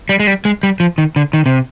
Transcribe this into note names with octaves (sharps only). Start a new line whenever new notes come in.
G3
G#3
G3
G#3
G3
F3
D#3
D3
D#3
C3